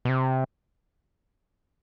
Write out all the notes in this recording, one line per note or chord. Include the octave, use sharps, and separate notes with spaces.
B2
C3